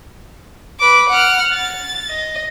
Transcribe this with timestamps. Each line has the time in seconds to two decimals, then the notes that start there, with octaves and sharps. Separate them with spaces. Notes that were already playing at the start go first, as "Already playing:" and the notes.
0.79 B4 D6
1.09 F#5 F6
1.54 A6
2.09 D#5